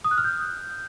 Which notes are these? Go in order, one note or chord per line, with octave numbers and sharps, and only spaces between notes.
D#6
F#6
F6
G6